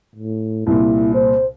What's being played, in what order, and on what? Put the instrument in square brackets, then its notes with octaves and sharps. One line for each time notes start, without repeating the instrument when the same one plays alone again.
[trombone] A2
[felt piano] C2 A#2 [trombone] E4
[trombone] C5